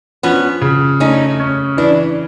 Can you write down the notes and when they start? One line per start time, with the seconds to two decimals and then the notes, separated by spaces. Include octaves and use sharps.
0.23 F3 B3 C#4
0.61 C#3
1.00 A3 C#4 D#4
1.40 C#4
1.77 E3 D4 E4